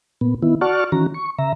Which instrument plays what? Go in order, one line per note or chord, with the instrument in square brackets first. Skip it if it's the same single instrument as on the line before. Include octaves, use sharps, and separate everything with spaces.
[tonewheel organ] A#2 B3
D#3 B3 E4
F#4 D5 F#5 A5 C#6 F6
D#3 E3 C#4 F#4 A#5
C#6
C#3 E5 A#5